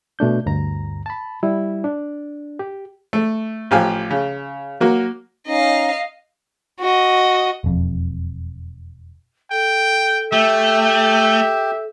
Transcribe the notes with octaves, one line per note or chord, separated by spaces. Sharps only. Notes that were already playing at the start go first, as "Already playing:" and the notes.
B2 A3 D4 G6
D2 G2 A#5
A5 B5
G3 E4
D4
G4
A3
A1 F3 G4 F5 G#5
C#3
F#3 A#3 F#4
C#4 D#4 D#5 F5
F#4 D#5
E1 F2
A4 G5
A3 G4 E5